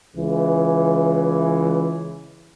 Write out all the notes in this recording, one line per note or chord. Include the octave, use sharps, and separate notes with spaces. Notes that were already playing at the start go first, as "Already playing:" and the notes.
C#2 E3